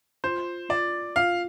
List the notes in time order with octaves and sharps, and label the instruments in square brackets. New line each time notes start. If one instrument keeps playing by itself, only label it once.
[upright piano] F4 [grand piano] C5
[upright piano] F4 [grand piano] D5
[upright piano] F4 [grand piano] F5